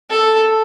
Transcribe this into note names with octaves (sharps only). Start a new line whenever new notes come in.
A4